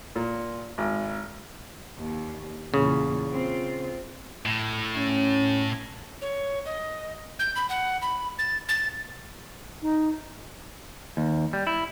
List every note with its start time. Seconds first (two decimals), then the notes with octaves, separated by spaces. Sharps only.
0.16 A#2
0.78 G#1
1.99 D#2
2.74 E2 A#2 C#3
3.31 C4 F4
4.46 A2
4.96 C#4
6.21 C#5
6.66 D#5
7.39 G6
7.56 B5
7.69 F#5
8.02 B5
8.39 A6
8.69 A6
9.82 D#4
11.17 D#2
11.53 G3
11.67 E4